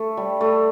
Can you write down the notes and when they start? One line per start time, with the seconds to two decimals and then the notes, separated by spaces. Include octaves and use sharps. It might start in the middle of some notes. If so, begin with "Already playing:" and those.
Already playing: A3
0.17 G3
0.41 A3